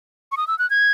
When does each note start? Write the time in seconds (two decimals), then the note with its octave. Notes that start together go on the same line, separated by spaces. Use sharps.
0.32 C#6
0.37 D#6
0.47 E6
0.59 F#6
0.70 G#6